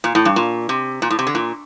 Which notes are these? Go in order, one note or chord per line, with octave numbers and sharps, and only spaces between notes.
A#2
A2
G2
A#2
C3
A#2
A2
C3
D3
A#2